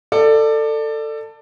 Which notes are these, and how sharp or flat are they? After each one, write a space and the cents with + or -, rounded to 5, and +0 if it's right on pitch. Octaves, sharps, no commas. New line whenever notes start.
A4 +20 D5 +20